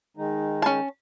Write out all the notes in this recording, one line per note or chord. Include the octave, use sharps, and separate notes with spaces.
D#3 G#3 D#4
C#4 A5